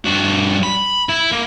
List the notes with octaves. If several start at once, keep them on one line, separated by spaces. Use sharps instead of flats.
G2 F#4
B5
E4
A#3